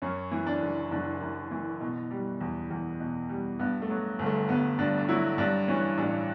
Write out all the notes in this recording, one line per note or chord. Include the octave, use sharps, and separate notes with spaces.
F#2 C#4
E3
D4
F#1
F#1 D4
F#2
E3
B2
G3
E2
E2
B2
G3
G2 B3
A3
F#3
G1
A3
G1 B3
G2 D4
D4
F#3 E4
G2 D4
E3 C#4
A1 D4